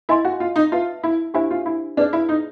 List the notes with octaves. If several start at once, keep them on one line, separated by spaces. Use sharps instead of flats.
E4 A#4 D#5 G#5 C6
F#4
F4
D#4
F4 B4 E5 A5
E4
D4 E4 G4 C5 E5 G#5
F4
E4
D4 D#4 G#4 B4 D5
E4
D#4